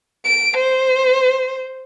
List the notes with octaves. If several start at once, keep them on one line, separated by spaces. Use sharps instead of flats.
D7
C5